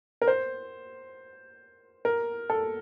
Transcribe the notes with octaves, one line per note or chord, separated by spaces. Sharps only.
A#4
C5
A#4
A4